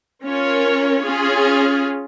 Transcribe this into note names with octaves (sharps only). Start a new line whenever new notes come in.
C#4 F4 A#4 C#5
C#4 F4 G#4